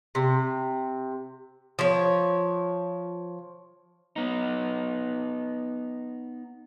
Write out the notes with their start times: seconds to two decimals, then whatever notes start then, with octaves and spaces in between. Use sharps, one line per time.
0.15 C3
1.79 F3 C#5
4.16 B3 D#4